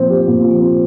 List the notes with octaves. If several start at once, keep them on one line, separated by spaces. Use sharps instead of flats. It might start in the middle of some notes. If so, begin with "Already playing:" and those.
Already playing: A#2 F3 C4
G4
A#2
F3
C4